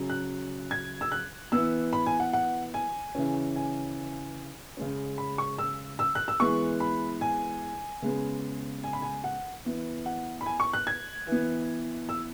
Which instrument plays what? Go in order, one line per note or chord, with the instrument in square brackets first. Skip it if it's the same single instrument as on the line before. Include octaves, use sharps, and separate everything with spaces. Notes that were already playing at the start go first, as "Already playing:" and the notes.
Already playing: [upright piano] C#3 F#3 C#4
F#6
G#6
E6
F#6
E3 B3 E6
B5
G#5
F#5
F#5
G#5
C#3 E3 C#4
G#5
C#3 G#3 C#4
B5
C#6
E6
E6
F#6
E6
E3 G#3 B3 C#6
B5
G#5
C#3 G#3 B3
G#5
B5
G#5
F#5
E3 B3
F#5
B5
G#5
C#6
F#6
G#6
E3 B3
E6